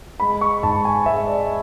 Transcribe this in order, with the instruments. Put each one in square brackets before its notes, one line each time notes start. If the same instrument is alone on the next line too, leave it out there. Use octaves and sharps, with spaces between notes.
[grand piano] G#3 B5
C#6
G#2 A5
G#5
G#3 E5
D5